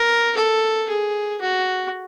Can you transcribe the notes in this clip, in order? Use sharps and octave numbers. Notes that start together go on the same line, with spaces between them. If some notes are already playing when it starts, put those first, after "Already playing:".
Already playing: A#4
A4
G#4
F#4